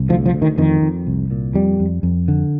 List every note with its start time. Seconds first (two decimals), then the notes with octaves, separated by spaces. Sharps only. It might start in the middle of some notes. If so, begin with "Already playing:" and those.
Already playing: C2
0.09 D2 F3
0.26 F3
0.33 D2
0.42 D#3
0.58 F2 D#3
0.82 F2
1.07 C2
1.31 A#2
1.54 F2 G3
1.80 F2
2.03 F2
2.28 D3